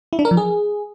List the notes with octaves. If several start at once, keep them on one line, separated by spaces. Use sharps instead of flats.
E4
D4
A#4
F3
G#4